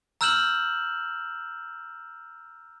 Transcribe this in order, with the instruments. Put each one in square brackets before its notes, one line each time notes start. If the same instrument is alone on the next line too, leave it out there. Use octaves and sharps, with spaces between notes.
[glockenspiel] A#5 E6 F6 G6 E7 F#7